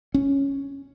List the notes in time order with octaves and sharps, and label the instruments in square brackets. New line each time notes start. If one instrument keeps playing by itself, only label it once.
[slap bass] C#4